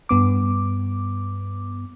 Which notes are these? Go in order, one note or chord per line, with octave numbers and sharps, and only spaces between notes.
G2 B3 D6